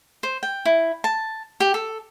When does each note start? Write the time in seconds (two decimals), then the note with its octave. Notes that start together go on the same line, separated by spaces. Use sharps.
0.23 C5
0.43 G5
0.65 E4
1.04 A5
1.60 G4
1.74 A4